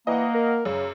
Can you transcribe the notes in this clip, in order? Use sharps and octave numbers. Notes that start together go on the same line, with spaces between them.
E3 A#3 D#5 F#5
A#4
F#2 C#3